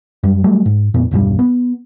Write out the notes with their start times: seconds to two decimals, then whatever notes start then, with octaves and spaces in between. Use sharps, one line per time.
0.23 F#2 G3
0.44 F#3 G3 A3
0.66 G#2
0.94 F2 A#2 B3
1.11 E1 B1 G2 G3
1.39 B3